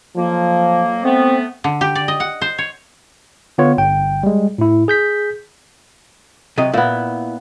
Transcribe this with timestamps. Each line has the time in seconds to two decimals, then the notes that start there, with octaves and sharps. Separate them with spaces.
0.16 F2 F3 F#3 A#3
1.04 A3 B3 C4
1.64 D3
1.81 G4
1.95 D5
2.08 D#5
2.20 F#5
2.41 C5
2.58 C#5
3.58 D3 B3 F4 C#5
3.78 G1 G5
4.23 G3 G#3
4.58 A2 E4
4.88 G#4 G6 B6
6.58 C3 F#3 D#5
6.74 A#2 B3 E4